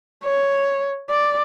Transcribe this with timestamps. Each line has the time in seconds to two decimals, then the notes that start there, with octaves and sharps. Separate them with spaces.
0.24 C#5
1.10 D5